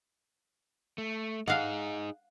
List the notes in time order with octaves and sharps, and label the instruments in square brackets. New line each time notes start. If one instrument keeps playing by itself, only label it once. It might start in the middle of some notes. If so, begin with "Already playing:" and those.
[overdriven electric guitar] A3
[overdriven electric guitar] D#4 G#4 [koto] F5 F#5